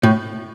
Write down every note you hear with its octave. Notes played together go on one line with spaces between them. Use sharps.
A2